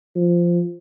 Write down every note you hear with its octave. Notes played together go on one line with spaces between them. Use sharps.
F3